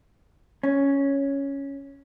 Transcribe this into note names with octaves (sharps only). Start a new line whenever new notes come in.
C#4